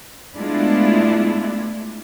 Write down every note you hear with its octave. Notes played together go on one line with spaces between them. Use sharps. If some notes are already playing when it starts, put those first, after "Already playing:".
G#3 A3 B3 D4 E4 F4